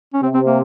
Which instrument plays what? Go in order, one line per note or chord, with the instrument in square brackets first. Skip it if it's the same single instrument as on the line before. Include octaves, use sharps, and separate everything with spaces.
[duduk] C#4
[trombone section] C3 [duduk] C4
[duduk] C4
A#3